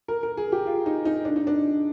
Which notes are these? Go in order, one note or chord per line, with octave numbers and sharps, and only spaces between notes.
A#4
A#4
G#4
G4
F4
D#4
D#4
D4
D#4
D4